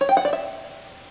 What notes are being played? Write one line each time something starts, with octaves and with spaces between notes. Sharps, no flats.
C#5
G5
F#5
D5
E5